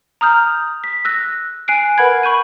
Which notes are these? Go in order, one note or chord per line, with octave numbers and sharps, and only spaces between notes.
A#5 D#6 F6 G6
B6
E6 F#6 A#6
G#5 F#6 C7 D7
A#4 B4 F#5 B5 G#6
B5 C#6 G6 D#7